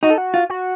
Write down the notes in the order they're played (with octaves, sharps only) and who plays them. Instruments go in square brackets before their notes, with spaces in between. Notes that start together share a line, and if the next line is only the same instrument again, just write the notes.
[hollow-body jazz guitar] D#4 [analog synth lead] F#4
[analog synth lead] A4
F#4
[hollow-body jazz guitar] F4
[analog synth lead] F#4